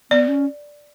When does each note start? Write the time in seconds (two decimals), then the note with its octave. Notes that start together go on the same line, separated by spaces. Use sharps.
0.11 B3 D5
0.28 C#4